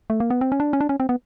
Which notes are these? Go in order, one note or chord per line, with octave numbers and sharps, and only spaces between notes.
A3
A#3
B3
C4
C#4
D4
C#4
D4
C#4
C4
B3